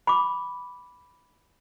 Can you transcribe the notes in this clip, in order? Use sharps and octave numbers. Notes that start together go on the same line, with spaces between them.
B5 D6